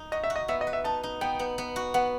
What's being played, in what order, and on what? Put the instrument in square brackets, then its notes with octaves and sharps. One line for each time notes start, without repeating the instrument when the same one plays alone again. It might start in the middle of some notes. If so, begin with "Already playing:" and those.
Already playing: [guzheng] D#4
[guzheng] F#4 [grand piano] D#5
[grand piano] E5
[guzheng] F#4
[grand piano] D#5
[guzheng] B3 [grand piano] E5
[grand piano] D#5
[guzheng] B4
[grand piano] E5
[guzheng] D#4 [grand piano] A5
[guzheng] D#4
[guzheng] B3 [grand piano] G5
[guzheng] B3
B3
F#4
[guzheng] B3 [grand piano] F#5